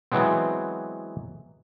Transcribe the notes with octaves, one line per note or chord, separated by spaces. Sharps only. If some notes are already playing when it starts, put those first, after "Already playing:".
E3 F#3 G#3 B3 C4